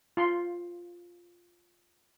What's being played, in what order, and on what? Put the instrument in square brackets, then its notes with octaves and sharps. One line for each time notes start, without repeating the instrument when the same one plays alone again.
[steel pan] F4 C6